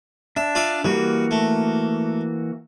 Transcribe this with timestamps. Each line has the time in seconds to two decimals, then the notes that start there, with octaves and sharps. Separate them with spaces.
0.37 D4 E5
0.55 F4 D5 E5
0.84 E3 G3 A#3 F#4
1.31 A3